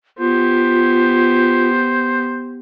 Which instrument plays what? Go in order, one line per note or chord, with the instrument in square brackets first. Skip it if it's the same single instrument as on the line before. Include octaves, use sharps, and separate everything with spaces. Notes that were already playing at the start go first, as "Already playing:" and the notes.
[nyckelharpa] B3 G4 [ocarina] F4 [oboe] C5